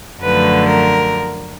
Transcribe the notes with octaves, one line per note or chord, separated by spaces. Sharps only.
F#2 D3 F3 A3 B4
A#4